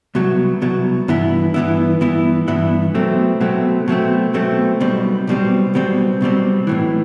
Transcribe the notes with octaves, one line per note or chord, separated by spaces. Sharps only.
C2 B2 F#3
C2 B2 F#3
G2 E3 B3 E4
G2 E3 B3 E4
G2 E3 B3 E4
G2 E3 B3 E4
B2 F#3 A3 C4
B2 F#3 A3 C4
B2 F#3 A3 C4
B2 F#3 A3 C4
B1 B2 G3 C4
B1 B2 G3 C4
B1 B2 G3 C4
B1 B2 G3 C4
B1 A2 E3